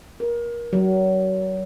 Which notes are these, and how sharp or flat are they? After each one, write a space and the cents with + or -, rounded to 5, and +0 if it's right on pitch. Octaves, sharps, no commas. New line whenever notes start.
A#4 +25
F#3 +30